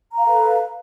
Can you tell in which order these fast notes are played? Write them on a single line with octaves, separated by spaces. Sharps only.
A#5 F5 A4 B4